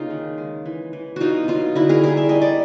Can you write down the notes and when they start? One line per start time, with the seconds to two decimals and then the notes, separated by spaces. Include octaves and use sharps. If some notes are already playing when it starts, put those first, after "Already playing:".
Already playing: C#3 A#3 D#4 F4
0.10 D#3
0.38 G#3
0.66 E3
0.93 E3
1.16 B2 D#4 F4 F#4
1.48 F#3 D#4 F4
1.75 D3 E4 F#4
1.89 G#4 A#4
2.03 G3 G#4 A#4
2.17 E5
2.29 G3 D#5
2.42 D5